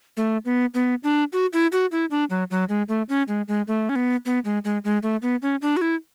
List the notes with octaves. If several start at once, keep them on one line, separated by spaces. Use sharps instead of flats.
A3
B3
B3
D4
F#4
E4
F#4
E4
D4
F#3
F#3
G#3
A3
C#4
G#3
G#3
A3
C#4
B3
B3
G#3
G#3
G#3
A3
B3
C#4
D4
F#4
E4